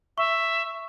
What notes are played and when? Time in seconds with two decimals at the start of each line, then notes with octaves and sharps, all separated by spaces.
0.18 E5 C#6